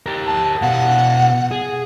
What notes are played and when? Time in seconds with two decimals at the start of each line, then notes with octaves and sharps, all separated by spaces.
0.06 G4 A#4
0.26 A5
0.62 B2 F5 F#5
1.51 G#4